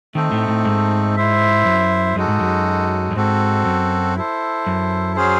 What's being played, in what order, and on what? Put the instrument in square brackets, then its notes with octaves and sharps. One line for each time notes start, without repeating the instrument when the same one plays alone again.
[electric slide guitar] D#3 [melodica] A3 C4 D#4 A4
[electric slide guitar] A2
A2
G#2
[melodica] E4 C5 E5
[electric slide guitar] F#2
[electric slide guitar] F#2 [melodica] G#3 D#4 F#4 A4
[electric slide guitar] G#2
F#2
F#2
[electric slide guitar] G#2 [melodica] C4 F#4 A4
[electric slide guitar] F#2
[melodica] E4 A4 C5
[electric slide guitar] F#2
[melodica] F#3 C#4 G#4 C5